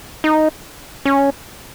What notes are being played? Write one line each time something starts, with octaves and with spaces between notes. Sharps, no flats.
D#4
C#4